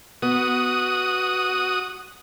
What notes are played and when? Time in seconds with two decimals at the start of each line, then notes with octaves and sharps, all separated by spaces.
0.22 B3 F#4 D#6